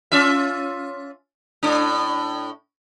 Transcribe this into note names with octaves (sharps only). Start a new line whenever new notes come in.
C#4 F4 E5
A2 D4